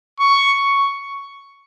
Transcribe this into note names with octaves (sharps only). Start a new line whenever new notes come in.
C#6